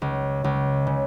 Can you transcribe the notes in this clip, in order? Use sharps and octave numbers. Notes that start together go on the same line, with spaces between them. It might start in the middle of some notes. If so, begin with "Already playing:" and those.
C#2
C#2
C#3